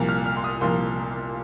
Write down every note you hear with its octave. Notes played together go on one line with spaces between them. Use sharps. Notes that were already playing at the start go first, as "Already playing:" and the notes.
Already playing: C2 A#2 F3 A#3
F6
F6
C6
D#6
C2 A#2 F3 A#3 C6